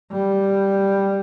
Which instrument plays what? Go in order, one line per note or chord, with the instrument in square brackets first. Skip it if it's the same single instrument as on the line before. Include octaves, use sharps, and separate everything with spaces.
[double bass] G3